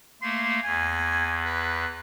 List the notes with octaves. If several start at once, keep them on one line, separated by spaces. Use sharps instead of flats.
A3 A#3 C6
E2 G#5
B4